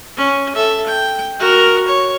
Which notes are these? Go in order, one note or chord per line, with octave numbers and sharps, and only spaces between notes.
C#4
A4 E5
G5
F#4 A#4
C#5